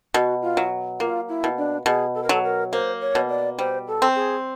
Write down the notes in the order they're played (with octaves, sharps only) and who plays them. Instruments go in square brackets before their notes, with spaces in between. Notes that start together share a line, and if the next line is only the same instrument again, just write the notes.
[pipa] B2 [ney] F#4
[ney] F4
[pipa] F#3
[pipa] A#3 [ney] F4
[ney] E4
[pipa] B2
[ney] D4
[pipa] B2 [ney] G#4
[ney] A4
A#4
[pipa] F#3 [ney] A4
[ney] A#4
[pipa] A#3 [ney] C5
[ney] C#5
[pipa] B2
[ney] D5
[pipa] G3 [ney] C5
[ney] A4
[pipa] C4
[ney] G#4